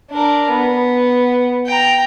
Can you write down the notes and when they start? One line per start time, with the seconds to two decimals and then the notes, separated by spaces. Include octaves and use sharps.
0.11 D4 A#4
0.50 B3
1.67 G5 A#5